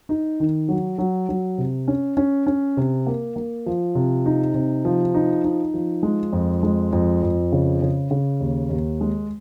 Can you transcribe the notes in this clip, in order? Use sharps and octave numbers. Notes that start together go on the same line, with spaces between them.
D#4
D#3
F#3
F#3
F#3
C3
C#4
C#4
C#4
C3
A#3
A#3
F3
C3
D#4
C3
F3
D#4
D#4
F3
G#3
F2
G#3
F2
F2
C#3
C#3
C#3
D#2
D#2
G#3